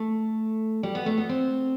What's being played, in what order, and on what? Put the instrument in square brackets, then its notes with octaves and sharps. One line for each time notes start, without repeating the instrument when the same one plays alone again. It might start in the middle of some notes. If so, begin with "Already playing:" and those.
Already playing: [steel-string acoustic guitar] A3
G3
B3
A3
B3
C4